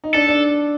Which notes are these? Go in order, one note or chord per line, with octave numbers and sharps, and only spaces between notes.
D#4
D4 A4
D4